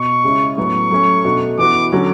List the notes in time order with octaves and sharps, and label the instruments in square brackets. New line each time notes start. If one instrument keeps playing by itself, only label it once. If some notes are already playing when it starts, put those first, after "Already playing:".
Already playing: [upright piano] B2 [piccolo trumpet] C#6
[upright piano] C#3 G#3 C#4 E4
[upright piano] A2 F#3 B3 [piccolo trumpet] C#6
[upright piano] F#3 A3 C#4
B2 A3 D4 F#4
[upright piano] E3 B3 F#4 [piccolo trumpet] D6
[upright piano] D3 F#3 C#4 F#4